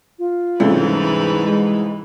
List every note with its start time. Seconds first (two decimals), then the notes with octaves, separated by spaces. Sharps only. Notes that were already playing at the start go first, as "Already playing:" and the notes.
0.19 F4
0.60 C2 G#2 C#3 E3 A3 B4
0.95 E4
1.41 G#3